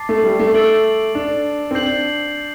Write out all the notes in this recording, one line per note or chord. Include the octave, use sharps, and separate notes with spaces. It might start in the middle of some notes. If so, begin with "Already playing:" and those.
Already playing: A5 D6 A6 C7
A3
G3
A3
A3 E6 A6 D7 F#7
D4
C4
D4 G6 C7 F#7